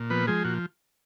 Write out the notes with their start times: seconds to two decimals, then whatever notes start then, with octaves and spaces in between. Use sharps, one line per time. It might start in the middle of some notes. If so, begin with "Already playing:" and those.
Already playing: A#2
0.10 F3 B3 B4
0.27 F3 G#3 G#4
0.45 A#2 F#4